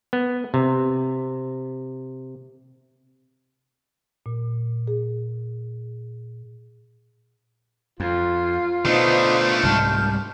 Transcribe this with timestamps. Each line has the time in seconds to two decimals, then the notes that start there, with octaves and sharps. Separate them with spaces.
0.13 B3
0.54 C3
4.26 A#2
4.88 G#4
8.00 F2 F4
8.85 B2 A3 D4 D#4 B4 C5
9.63 C2 G#2 G3 A5 F6 G6